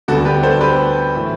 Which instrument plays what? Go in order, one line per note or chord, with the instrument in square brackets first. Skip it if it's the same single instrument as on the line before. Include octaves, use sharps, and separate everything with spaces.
[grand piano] D2 D3 G3 B3 F#4 A4
G4 B4
A4 C5
G4 B4
A2 E3